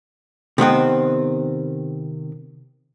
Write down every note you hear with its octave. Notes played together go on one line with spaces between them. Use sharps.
C3 D#3 B3 C4